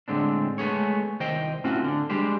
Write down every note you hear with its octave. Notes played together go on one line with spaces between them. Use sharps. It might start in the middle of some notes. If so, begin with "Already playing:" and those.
A2 D3 G#3 C4 D4
G#3 A3 B3 G#4 C#5
C2 D#3 C5 D#5 G5
A2 C4 C#4 F4 F#4
D3
G3 G#3 D4 G4 C5